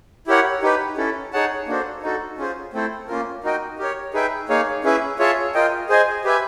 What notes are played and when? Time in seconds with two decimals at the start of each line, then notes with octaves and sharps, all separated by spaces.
0.27 E4 G4 A#4 C#5 F#5
0.62 D#4 G4 B4
0.97 C#4 E4 A4
1.33 D#4 G#4 C#5 F#5 A5
1.67 A#3 D4 F#4 A4 C5
2.02 D#4 F#4 A4
2.38 C#4 F4 G#4 C5
2.73 A3 C4 E4 A4 C5
3.08 A#3 C#4 F4 A#4
3.44 D#4 F#4 A#4 D#5 G5
3.79 G4 A#4 C#5
4.14 D#4 G#4 B4 E5 G5
4.49 A#3 D#4 G#4 C#5 F5
4.84 C#4 E4 G#4 B4 E5
5.19 F4 G#4 C#5 E5 A5
5.54 F4 A#4 D#5 G5
5.89 G#4 C5 D#5 G#5
6.24 G4 B4 E5 G#5